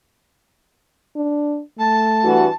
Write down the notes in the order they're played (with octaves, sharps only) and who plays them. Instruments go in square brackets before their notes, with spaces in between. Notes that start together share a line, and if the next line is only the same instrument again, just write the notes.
[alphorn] D4
[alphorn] A3 [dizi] A5
[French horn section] G2 E3 F#4